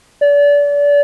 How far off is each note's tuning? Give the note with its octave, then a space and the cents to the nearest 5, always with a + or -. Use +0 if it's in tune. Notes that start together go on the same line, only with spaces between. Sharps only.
D5 -30